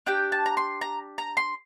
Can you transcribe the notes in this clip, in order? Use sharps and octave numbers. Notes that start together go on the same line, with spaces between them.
D4 G4 G5
A5
A#5
C6
A#5
A#5
C6